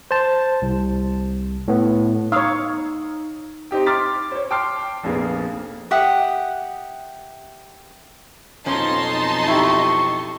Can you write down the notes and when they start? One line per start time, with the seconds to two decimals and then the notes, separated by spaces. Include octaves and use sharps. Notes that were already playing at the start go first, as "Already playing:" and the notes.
0.11 C5 A5
0.62 C2
1.68 A2 B3
2.32 D#4 C#5 F5 D#6 E6
3.71 C4 D#4 G4 G5
3.86 C6 D6 F6 A6 B6
4.32 C5 C#5
4.51 G5 A5 C6 D6 F6 C7
5.03 F1 A#1 A#3 B3 G#4
5.91 G4 E5 F#5 D#6
8.66 B1 F2 F3 C#4 D#4 A5 C6
9.48 E4 G4 C#6